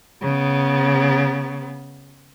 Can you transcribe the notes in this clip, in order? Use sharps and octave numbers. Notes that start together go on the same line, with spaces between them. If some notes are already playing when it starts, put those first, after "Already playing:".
C#3 B3